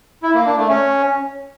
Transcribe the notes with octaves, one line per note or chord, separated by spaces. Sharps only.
E4
A#3
D4
A3
C#4